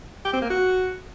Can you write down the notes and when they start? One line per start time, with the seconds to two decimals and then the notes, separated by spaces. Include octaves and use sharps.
0.25 G4
0.33 C4
0.42 A#3
0.50 F#4